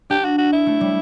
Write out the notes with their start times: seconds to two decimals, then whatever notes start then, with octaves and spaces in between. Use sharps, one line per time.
0.10 D4 G4
0.25 F#4
0.38 F#4
0.53 E4
0.67 A3
0.81 G3